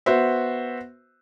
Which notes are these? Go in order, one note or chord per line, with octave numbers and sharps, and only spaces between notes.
B3 F#4 C5 E5